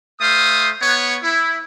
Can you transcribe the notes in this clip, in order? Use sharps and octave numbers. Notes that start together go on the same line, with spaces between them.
A3 C5 F5 D#6
B3 C#5
E4